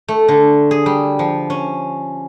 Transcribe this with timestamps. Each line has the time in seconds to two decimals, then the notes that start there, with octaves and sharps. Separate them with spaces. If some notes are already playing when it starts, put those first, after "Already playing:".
0.08 A3
0.28 D3
0.71 G#4
0.86 G3
1.19 F3
1.50 C#4